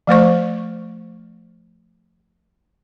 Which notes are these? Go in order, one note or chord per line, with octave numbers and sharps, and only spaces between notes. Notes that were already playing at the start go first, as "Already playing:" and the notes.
F3 A3 C5 C#6